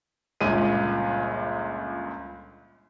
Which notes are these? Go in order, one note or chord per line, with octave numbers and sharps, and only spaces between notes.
G1 C#2 A#2 D#7